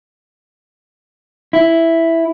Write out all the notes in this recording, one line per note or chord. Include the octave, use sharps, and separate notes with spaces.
E4